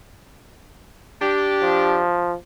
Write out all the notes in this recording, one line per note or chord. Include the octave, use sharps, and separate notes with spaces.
D4 G4
F3